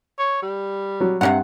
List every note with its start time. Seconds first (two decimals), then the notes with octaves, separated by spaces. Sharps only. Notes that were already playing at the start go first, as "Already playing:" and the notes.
0.18 C#5
0.42 G3
1.01 F#3
1.21 G2 C3 C#4 F#5